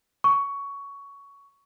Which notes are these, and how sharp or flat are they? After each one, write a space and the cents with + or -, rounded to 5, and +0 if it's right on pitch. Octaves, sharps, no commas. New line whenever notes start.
C#6 +15